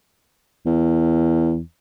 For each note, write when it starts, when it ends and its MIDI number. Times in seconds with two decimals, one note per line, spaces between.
0.66 1.60 40